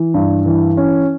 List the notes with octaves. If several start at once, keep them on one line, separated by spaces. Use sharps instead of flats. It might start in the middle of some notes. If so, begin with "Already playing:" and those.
Already playing: E3
G2
E3
C#4